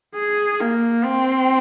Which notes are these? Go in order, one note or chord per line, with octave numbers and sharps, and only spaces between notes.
G#4
A#3
C4